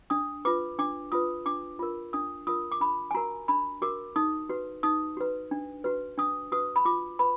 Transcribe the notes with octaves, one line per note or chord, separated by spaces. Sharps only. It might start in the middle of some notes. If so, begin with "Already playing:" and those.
D4 D#6
F4 B4 D6
D4 D6
F4 B4 D#6
D4 D6
F4 A#4
D4 D#6
F4 A#4 D#6
D6
D4 B5
G#5
F#4 A#4 A#5
D4 B5
F#4 A#4 D6
D#4 D#6
F#4 B4
D#4 D#6
F#4 B4
D4
F#4 B4
D4 D#6
F#4 B4 D#6
B5
F4 D6
B4 B5